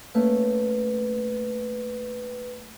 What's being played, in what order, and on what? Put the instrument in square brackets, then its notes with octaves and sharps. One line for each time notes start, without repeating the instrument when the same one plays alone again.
[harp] A3 A#3 C#4 [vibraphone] B4